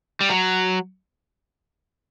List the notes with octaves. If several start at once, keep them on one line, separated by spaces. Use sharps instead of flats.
G3
F#3